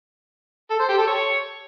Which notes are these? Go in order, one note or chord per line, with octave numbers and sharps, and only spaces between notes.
A4
C5
G4
A4
C#5